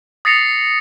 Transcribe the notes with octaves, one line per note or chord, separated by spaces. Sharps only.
D#6 A6 A#6 C7 C#7 F7